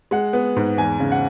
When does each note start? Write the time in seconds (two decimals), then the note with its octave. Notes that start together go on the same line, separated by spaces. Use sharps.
0.11 G#3 F#5
0.33 B3
0.57 G#2
0.77 E2 G#5
1.00 C#3
1.12 F#5